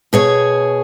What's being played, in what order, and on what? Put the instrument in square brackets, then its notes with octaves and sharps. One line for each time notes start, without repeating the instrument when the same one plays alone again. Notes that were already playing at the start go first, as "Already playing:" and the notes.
[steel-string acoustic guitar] B2 G#4 C#5